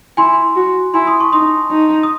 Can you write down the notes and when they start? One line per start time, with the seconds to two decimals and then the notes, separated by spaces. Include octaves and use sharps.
0.17 E4 G#5 C6
0.56 F#4
0.94 E4 G#5 C6
1.07 C6 D#6
1.20 A5 C#6
1.32 D#4 C6 D#6
1.71 D#4
2.03 D#6